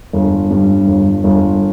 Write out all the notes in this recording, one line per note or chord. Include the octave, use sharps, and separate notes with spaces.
G1
G2
G1
G1